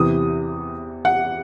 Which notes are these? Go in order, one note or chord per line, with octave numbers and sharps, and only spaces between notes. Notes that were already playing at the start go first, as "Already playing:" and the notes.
Already playing: E2 C3 E3 D#6
F#5